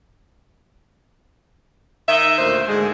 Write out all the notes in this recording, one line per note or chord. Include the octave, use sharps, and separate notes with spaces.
D#3 D#5 E5
D2 A#2 A#3 C5
G#2 D3 G#3